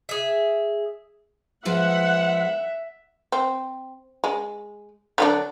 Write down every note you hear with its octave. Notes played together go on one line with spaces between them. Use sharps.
G#4 E5
F3 G#3 B3 E5 F#5
C4
G#3
D3 F#3 D4